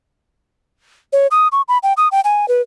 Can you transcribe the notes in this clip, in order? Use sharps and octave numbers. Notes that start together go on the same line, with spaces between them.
C#5
D#6
C#6
B5
G5
D#6
G5
G#5
B4